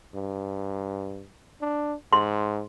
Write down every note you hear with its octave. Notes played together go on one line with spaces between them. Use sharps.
G2
D4
G#2 C6